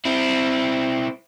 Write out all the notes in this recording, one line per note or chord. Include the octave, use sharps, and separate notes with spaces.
C4 E4